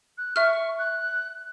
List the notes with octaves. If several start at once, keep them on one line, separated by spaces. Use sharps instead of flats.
F#6
E5 C#6 F6
F#6